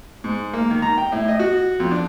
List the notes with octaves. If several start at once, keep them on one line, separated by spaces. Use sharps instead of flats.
G#2
A#3
D#3
A#5
G5
A2
D#5
F#4
F2
D4